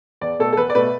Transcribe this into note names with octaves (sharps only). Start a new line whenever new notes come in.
E2 D5
B2 A3 A4
A4
E2 B4
D5
B2 A3 B4